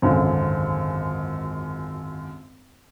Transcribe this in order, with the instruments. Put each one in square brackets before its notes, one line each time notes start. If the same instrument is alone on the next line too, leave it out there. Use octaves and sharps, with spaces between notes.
[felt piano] G#1 C#2 F#2 D3